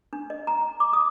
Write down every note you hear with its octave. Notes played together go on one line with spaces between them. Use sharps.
D4
D#5
A#5
D6
D#6